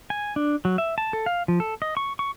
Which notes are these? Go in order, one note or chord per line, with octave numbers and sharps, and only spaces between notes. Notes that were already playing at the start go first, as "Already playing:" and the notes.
G#5
D4
F#3
E5
A5
A4
F5
F3
A4
D#5
C#6
C#6